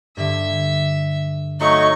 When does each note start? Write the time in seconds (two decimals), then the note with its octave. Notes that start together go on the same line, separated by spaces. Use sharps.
0.17 G2 D3 E5
1.60 F#3 A3 D#4 C#5 D#5 C#6